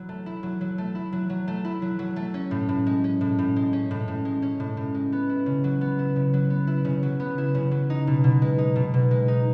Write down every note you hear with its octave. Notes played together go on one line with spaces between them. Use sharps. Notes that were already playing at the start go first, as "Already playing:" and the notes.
Already playing: F#3 E4
A3
E4
F#3
F#3
A3
E4
F#3
F#3
A3
E4
F#3
F#3
A3
C#4
A2
A2
G#3
C#4
A2
A2
G#3
C#4
A2
A2
G#3
C#4
A2
A2
G#3
B3
E4
C#3
F#3
B3
E4
C#3
F#3
B3
E4
C#3
F#3
B3
E4
C#3
F#3
D#4
B2
B2
G#3
D#4
B2
B2
G#3
D#4